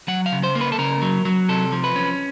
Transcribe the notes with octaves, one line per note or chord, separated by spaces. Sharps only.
F#3 F#5
F5
C#3
C5
A#3
B4
A4
C#3 A#4
F#3
F#3
C3 A4
F3
B4
C#4